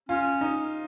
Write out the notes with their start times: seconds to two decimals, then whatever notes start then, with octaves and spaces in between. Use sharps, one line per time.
0.09 C#4 F4
0.41 D#4